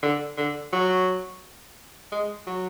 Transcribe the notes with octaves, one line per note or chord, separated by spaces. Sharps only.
D3
D3
F#3
G#3
F#3